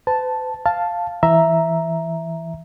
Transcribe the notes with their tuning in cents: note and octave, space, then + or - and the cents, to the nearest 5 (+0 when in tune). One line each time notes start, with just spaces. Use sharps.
B4 +45 A5 +0
F5 +0 A5 +0
E3 +0 E5 +0 A#5 +0